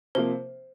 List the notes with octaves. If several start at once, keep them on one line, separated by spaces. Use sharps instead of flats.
C3 F3 A#3 C5